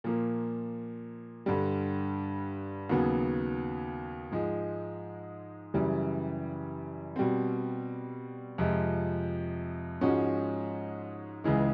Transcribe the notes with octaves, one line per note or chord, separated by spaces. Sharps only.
A#2 F3 A#3
G2 D3 G3
D#2 C#3 F#3 B3
G#2 F3 G#3
F#2 C#3 E3 G3
B2 G3 C4
F2 C3 F3 G#3
G#2 F3 G#3 C#4 F#4
C#2 C#3 E3 G#3